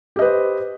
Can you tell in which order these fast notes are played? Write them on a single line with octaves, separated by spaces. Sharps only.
G4 D#5 B4 C5